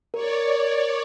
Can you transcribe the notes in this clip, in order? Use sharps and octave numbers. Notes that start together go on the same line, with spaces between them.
A#4 C#5 D5